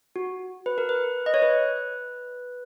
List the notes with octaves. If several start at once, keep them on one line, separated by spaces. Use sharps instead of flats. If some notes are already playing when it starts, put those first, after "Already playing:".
F#4
B4
A#4
B4
D#5
C#5
B4